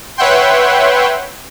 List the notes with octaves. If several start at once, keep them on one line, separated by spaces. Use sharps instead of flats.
B4 C#5 E5 F#5 G5 C6